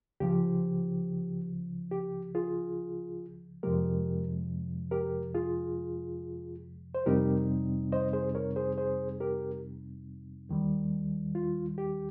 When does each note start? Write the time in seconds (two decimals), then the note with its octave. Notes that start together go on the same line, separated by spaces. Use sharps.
0.20 C#2 C#3 F3 G4
1.91 G4
2.35 F4 G#4
3.63 F2 C3 F3 G#3 G4 A#4
4.91 G4 A#4
5.34 F4 G#4
6.95 C5
7.06 F2 C3 G3 C4 D#4 G4 A#4
7.92 C5 D#5
8.13 G#4 C5
8.35 A#4 C#5
8.56 G#4 C5
8.78 G#4 C5
9.20 G4 A#4
10.49 D#2 D#3 G3
11.35 F4
11.78 G4